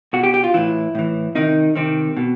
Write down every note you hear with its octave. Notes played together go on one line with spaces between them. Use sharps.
B2 F#4
G4
G4
F4
A2 E3 E4
A2 E3
C3 D#3 D#4
C3 D#3 C4
B2